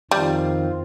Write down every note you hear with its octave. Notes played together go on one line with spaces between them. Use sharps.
F2 D#3 G3 C4 F4